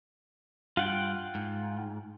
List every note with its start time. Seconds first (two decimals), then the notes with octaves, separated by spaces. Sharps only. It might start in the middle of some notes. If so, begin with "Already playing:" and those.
0.77 G2 F4 F#5 G5
1.35 G#2